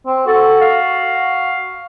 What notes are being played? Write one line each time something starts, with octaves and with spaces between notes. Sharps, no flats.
C4
F#4 A4
F5